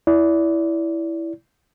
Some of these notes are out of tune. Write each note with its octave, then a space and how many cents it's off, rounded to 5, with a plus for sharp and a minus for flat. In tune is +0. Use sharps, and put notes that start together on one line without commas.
E4 +0 D5 -30